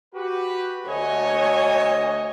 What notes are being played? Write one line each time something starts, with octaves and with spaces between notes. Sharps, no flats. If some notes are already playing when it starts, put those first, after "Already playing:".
F#4 G4 B4
D2 F#4 C#5 D#5 G#5